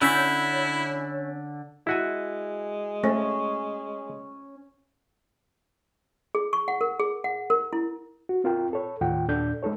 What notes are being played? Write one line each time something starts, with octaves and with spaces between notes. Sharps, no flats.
D3 C#4 E4 E6 G6 B6
G#3 E4 F#4 G#5
A3 C#4
G#4
C#6
F#5
A#4
G#4
F#5
A#4
E4
F#4
C4 F4 A#4 G5
A4 C#5
D#2 A2 D#3 F4 F#5 G5
D#2 A#2 D4 A4 D5 G6
G#3 D#4 A4 C#5